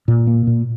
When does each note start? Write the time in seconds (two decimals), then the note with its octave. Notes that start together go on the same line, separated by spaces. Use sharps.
0.08 A#2
0.27 A#3
0.47 A#2